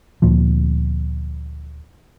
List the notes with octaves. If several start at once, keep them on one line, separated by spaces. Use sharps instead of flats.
D2 A#2 F3